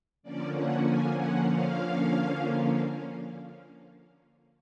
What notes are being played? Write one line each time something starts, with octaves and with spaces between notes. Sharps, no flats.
D3 F3 A#3 C#4 D5
F#5
G#5
F#5
F5